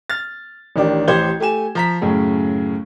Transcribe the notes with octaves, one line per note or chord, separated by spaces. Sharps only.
F6 A6
A1 D#3 D4 G4
A1 G4 C5 G#6 G7
A3 G4 G#5 E7
F3 A#5 B6
F#2 A2 C#3